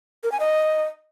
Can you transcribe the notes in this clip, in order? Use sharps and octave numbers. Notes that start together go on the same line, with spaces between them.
A#4
G#5
D#5